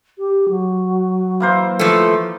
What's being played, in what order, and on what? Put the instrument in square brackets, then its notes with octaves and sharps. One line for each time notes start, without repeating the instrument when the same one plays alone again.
[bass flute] G4
F#3
[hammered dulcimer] E3 A#3 C5
[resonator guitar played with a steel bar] F3 A3